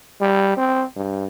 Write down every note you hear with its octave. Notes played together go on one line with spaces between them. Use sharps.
G3
C4
G2